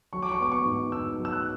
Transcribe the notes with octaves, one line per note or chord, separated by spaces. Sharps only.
F#3 C#6
D6
C#6
B3 D6
C#6
G#2
G#2 E6
F#3
E6
F#6